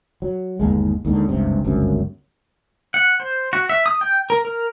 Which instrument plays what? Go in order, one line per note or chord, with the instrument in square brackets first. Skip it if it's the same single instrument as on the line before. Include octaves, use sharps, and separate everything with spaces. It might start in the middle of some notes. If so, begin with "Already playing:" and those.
[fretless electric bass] F#3
G1 D#2 G#3
D#2 G#2 D3
F#1 C#2 G2 C3
G1 C#2 F#2 C4
[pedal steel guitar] F#5
C5
F#4
E5
D#6
G5
A#4
A#4